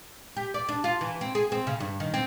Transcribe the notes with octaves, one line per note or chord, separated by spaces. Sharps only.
G4
D5
D4
F4
E3
C4
G#4
C4
C#3
G2
D#3
C4